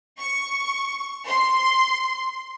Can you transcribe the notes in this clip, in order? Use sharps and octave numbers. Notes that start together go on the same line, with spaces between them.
C#6
C6